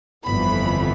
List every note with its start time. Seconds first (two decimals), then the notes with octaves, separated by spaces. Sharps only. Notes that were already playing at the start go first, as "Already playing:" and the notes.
0.24 G1 F2 E3 B3 B5